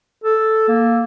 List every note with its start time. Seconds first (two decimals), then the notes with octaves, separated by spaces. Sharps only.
0.24 A4
0.68 A#3